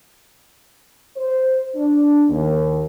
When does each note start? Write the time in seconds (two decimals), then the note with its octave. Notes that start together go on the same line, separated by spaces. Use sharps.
1.16 C5
1.75 D4
2.29 D#2